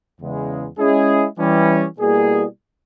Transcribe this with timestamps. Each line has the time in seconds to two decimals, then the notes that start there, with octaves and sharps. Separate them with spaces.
0.20 E2 C#3 G#3
0.78 G#3 C#4 E4 G#4
1.38 E3 G3 C#4
1.98 B2 G3 A#3 E4 G#4